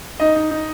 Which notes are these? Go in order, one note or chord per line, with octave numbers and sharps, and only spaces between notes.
D#4 D#5
D#4
D#4